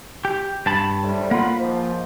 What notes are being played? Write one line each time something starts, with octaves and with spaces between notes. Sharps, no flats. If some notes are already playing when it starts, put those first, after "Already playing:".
G4
G2 A5 B5
A2 C3 G3
A#3 F4 F#5 B5
G#2 F3